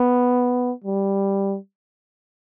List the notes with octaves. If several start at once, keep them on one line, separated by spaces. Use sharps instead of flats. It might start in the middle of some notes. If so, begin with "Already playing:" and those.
Already playing: B3
G3